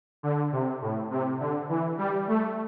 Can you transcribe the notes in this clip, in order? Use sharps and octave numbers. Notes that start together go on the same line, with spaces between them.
D3
C3
A2
C3
D3
E3
G3
A3